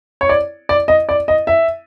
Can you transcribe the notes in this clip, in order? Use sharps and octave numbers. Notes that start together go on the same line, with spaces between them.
C#5
D5
D5
D#5
D5
D#5
E5